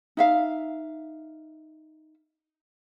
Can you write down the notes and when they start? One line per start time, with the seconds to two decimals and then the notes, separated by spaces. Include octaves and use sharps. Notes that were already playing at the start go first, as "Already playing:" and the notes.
0.17 D#4 E5 F5